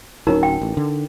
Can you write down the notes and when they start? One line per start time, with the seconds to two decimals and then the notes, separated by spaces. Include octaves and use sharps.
0.27 D1 F#3 C#4 D#4 A#4 A#5
0.43 G5
0.62 A1
0.77 D3